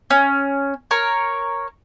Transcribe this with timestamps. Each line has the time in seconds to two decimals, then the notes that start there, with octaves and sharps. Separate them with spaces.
0.11 C#4
0.91 A#4 C#5